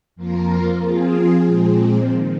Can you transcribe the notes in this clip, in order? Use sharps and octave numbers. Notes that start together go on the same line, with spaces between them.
F2 F3 A#3 F4 A#4
F3 C4 F4 G#4
A#2 F3 G#3 C4
D#3